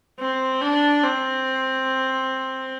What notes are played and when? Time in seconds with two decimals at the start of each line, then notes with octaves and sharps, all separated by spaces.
0.20 C4
0.62 D4
1.04 C4